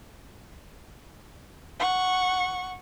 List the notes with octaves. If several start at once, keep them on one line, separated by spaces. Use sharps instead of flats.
F#5 C#6